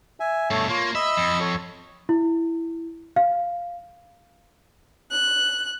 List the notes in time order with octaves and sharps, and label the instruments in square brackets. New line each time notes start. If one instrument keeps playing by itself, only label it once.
[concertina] E5 G#5
[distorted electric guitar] G2 B2 [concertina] A3 A4 C#5
[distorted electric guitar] A#3 [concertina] F4 C#5
[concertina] D#5 B5 E6 [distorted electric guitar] E5
[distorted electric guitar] F2
[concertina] A4 C#5
[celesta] E4
F5
[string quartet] F#6